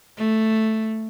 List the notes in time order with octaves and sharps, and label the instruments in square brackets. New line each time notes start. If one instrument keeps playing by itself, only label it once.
[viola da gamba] A3